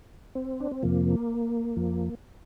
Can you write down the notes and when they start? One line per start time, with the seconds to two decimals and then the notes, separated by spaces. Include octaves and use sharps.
0.35 C4
0.60 D4
0.71 C4
0.83 F2 C3 F3 A#3
1.76 F2 F3